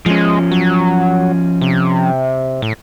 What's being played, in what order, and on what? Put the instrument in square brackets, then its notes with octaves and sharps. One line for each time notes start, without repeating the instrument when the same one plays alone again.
[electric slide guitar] F3 C#4 [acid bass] G#3
[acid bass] F#3
C3
A2